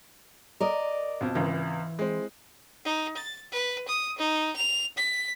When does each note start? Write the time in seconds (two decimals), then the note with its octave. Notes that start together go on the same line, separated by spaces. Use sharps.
0.60 A#4 D5 D#5
1.21 B1 F2
1.35 G#1 C#2 E3
1.99 G#3 C4
2.85 D#4
3.17 A6
3.52 B4
3.88 D#6
4.18 D#4
4.56 F7
4.97 B6